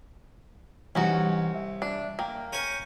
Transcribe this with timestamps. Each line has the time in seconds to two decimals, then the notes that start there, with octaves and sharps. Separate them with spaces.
0.95 C2 E3 C#4 D#4 F#4
1.54 E5
1.82 D4
2.19 A#3 G5
2.53 C#4 A#4 G#5 G6